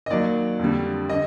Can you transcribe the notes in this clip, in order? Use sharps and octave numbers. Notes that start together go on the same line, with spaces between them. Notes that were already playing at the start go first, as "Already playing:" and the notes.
D#5
D#2 D#3 F#3 D5
F2 D3 G3
D3 D#5